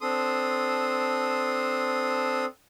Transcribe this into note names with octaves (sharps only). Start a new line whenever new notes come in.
C4 D4 A4 C6 D#6